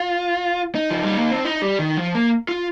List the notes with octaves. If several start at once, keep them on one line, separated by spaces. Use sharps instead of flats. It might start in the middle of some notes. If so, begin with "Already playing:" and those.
Already playing: F4
D#4
F3
G3
A#3
C4
D#4
G3
D#3
F3
A#3
F4